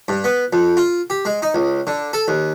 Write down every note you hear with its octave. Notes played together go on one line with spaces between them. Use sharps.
G2
B3
F2
F4
G4
G#3
D#4
C#2
D3
A4
D#2